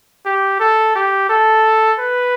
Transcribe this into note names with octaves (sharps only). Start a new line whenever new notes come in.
G4
A4
G4
A4
B4